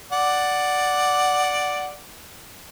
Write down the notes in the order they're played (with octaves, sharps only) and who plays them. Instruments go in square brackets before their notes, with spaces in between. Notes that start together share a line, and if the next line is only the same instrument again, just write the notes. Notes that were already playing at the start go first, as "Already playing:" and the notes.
[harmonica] D5 F#5